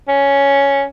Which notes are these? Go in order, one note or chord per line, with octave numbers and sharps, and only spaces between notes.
C#4